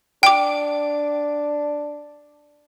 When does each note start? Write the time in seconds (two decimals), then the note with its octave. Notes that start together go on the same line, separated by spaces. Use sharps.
0.23 D4 G5 D6